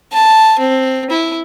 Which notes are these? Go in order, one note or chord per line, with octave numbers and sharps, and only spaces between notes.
A5
C4
E4